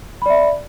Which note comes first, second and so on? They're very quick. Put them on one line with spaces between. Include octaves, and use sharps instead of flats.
B5 D5 E5